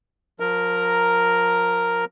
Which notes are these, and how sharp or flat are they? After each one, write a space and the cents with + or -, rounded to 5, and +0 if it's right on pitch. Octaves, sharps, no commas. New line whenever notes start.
F3 +30 A#4 +0 A#5 +0